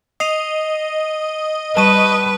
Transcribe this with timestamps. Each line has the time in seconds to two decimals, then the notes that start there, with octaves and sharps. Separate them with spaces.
0.20 D#5 D#6 C7 F7
1.77 G3 B4 A5 C#6 D#6 D#7